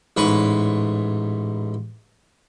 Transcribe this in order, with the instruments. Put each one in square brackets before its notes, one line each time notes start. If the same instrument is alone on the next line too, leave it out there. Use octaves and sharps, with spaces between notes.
[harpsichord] A1 G#2 B4 C#5 C#6